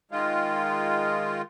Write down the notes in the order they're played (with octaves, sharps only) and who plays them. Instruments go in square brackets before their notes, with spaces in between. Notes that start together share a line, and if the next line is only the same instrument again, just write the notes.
[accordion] D#3 G#3 F4